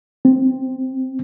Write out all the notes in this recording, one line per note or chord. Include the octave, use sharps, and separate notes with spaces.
C4